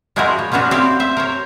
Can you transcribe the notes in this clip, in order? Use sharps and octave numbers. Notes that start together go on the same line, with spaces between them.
F3 G#3 E4 F#4 G#4 A#4
C#5
F3 B3 C#4 D4 F#4
C4 E4 G4 F5
C5 E5
A#4 C5 C#5